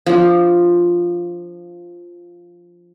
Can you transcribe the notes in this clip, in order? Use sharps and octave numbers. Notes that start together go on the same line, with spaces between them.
F3 D4